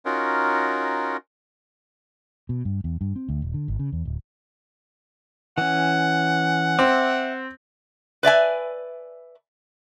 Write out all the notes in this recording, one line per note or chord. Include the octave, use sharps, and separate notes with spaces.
C#4 D#4 F4 F#4 A#4
B2
G2
E2
G2
C4
D2
D#1
D3
G#1
C#3
E2
D1
E3 C#4 F#5
C4 E5 D6
B4 D5 E5 G#5